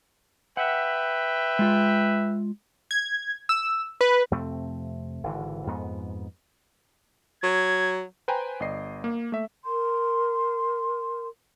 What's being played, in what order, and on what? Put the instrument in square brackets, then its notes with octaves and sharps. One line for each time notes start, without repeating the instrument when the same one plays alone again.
[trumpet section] B4 E5 G5 [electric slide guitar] F#5
[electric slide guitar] G#3 F4
[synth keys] G#6
E6
B4
[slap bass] F2 C3 A3 C4
G#1 D3 E3
F2 G#2 B3
[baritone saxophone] F#3 [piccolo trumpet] G#6
[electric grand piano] B4 C5 G5 G#5 A#5
G1 D5 D#5 C7
A#3
A3 E5
[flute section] A#4 C6